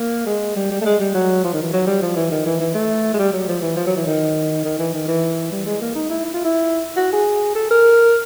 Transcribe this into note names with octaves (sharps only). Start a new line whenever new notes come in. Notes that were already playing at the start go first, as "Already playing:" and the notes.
Already playing: A#3
G#3
G3
G3
A3
G#3
G3
F#3
F3
D#3
E3
F#3
G3
F3
E3
D#3
E3
E3
A3
G#3
G3
F#3
F3
E3
F3
F#3
E3
D#3
D#3
E3
D#3
E3
G3
G#3
A#3
D#4
E4
E4
F4
E4
F#4
G#4
A4
A#4